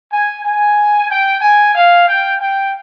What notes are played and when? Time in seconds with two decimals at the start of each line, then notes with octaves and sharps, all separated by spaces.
0.11 G#5
0.44 G#5
1.10 G5
1.41 G#5
1.75 F5
2.07 G5
2.39 G5